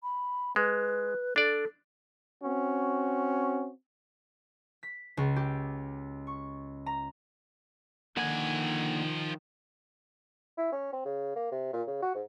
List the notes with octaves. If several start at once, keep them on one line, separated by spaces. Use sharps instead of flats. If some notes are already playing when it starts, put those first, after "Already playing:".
B5
G#3 B4
D4 A4 D5
C4 C#4 F#4
B6
C#2
G4
C#6
A#5
D3 D#3 F3 A#3 F#5 G#5
E4
C#4
C4
C#3
A#3
C3
A#2
C#3
F#4
G#2